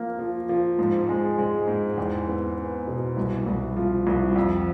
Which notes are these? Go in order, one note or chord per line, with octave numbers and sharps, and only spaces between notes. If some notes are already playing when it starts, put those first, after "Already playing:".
Already playing: F3 A#3
F3
F3
G#2
G#3
G#3
G#2
E2
B3
B3
B2
C2
C2
F3
C2
F2